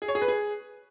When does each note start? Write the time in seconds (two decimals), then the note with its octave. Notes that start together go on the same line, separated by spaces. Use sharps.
0.02 G#4
0.08 C#5
0.15 G#4
0.22 B4
0.28 G#4